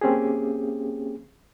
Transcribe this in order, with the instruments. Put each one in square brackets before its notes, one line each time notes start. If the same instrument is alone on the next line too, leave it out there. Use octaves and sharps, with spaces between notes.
[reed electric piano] A#3 C4 C#4 G4 G#4